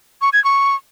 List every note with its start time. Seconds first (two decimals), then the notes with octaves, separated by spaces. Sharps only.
0.21 C#6
0.33 G#6
0.44 C#6